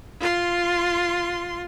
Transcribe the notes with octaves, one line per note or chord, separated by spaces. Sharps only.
F4 C6